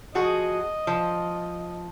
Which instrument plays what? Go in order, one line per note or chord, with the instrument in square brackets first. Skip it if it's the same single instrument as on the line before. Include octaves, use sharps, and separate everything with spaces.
[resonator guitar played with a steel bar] F3 F#4 G#4 [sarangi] D#5
[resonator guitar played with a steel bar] F3